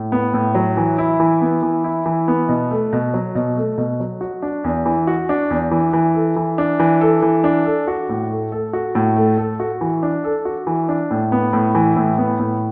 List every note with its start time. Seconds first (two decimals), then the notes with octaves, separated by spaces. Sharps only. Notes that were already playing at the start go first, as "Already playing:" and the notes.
Already playing: A2
0.12 B3
0.34 A2
0.55 F#3
0.77 E3
0.98 E4
1.20 E3
1.41 B3
1.63 E3
1.84 E4
2.06 E3
2.28 B3
2.49 B2
2.71 A3
2.93 B2
3.14 F#3
3.35 B2
3.57 A3
3.78 B2
4.00 F#3
4.21 F#4
4.42 D4
4.64 E2
4.86 E3
5.07 F#4
5.29 D4
5.50 E2
5.71 E3
5.93 E3
6.15 A4
6.36 E3
6.58 D4
6.80 E3
7.01 A4
7.22 E3
7.44 D4
7.65 A4
7.88 F#4
8.09 A2
8.31 A3
8.52 A4
8.73 F#4
8.95 A2
9.16 A3
9.38 A4
9.60 F#4
9.81 E3
10.03 D4
10.24 A4
10.45 F#4
10.67 E3
10.89 D4
11.11 A2
11.32 B3
11.53 A2
11.75 E3
11.96 A2
12.18 B3
12.40 A2